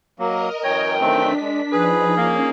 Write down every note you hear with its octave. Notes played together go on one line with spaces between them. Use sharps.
F#3 A#3 A#4 D#5
F#2 E3 C#5 G5
D#3 A3 C4 D4 B6
G#3
F3 D#4 G#4 B4
A#3 C#4